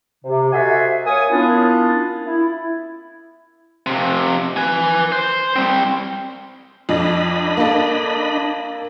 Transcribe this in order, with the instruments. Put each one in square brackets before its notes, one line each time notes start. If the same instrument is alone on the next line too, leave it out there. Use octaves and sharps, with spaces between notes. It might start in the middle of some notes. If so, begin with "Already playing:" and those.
[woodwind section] C3
F#4 A4 C5 D#5 E5 G#5
A#3 C#5 G#5 D#6
A#3 B3 C#4 D4 E4 F4
E4
[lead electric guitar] F2 C3
B4 G#5
C5
G3 C4
[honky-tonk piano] F2 [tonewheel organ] D4 D#5 B5
[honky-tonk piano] A#3 A4